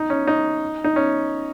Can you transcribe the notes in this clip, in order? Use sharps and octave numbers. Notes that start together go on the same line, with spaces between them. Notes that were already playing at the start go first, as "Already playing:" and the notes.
Already playing: D#4
C#4
D#4
D#4
C#4